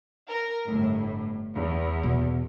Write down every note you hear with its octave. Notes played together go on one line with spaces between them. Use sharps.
A#4
G1 A2
E2
B2